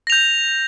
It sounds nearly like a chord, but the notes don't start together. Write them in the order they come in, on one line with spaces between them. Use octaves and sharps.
A#6 F7 G6